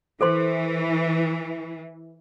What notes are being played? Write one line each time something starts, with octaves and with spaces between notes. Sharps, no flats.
E3 A4 C5 C6